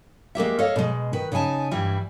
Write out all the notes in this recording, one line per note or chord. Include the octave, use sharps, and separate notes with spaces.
G#3 A#3 G4 E5
A4 C#5 D#5 F5
B2 G#3
D#3 B4
C#3 D#4 E5 G#5 A5
G2 E3 G3 E4